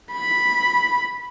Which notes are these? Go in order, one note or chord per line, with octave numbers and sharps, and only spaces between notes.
B5